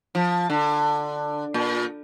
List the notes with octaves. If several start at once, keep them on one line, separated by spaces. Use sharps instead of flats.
F3
D3
A#2